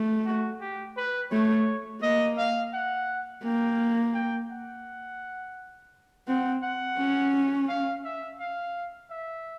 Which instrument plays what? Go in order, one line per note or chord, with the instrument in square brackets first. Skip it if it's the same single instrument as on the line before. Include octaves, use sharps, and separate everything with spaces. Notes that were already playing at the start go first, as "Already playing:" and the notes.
Already playing: [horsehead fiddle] A3
[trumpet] F#4
G4
B4
[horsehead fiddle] A3 [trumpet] C#5
[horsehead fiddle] A#3 [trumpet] D#5
[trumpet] F5
F#5
[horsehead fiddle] A#3 [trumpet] G5
[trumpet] G5
F#5
[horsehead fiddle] C4 [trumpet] F#5
[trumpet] F#5
[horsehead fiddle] C#4
[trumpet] F5
E5
F5
E5